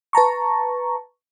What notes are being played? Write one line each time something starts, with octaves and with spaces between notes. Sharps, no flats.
B4 A5 A#5 C#6